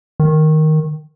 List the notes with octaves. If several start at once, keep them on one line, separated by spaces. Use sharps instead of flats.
D#3